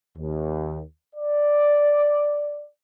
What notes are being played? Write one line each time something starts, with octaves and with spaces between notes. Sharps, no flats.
D#2
D5